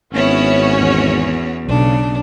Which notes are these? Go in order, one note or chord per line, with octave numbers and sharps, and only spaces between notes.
G#1 B3 C#4 E4 F#4 C#5
E2
B1 C#3 D4